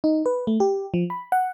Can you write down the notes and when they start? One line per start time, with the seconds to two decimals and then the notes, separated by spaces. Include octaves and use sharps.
0.04 D#4
0.26 B4
0.47 A3
0.60 G4
0.94 F3
1.10 B5
1.32 F#5